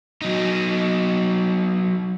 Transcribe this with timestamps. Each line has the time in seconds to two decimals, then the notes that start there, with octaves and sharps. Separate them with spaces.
0.22 F#3 D#4